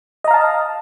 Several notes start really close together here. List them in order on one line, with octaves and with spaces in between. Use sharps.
D#5 A#5 F5 A5